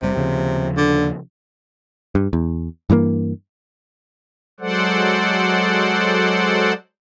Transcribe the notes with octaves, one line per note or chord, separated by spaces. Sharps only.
F#1 C3 G3
D#2 C#3 F3
D3
G2
E2
G2 E3 F3 A#3
F#3 G#3 A4 C5 D5 F#5